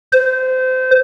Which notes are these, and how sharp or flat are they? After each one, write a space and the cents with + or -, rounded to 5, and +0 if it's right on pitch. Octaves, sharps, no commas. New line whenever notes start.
C5 -25